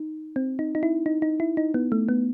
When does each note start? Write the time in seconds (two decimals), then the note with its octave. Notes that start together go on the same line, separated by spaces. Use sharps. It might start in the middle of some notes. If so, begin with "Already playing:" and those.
Already playing: D#4
0.36 C4
0.59 D#4
0.75 D#4
0.83 E4
1.06 D#4
1.22 D#4
1.40 E4
1.57 D#4
1.74 B3
1.92 A3
2.09 B3